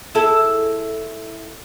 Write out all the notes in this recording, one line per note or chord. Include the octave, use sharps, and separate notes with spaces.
E4 G#4 A4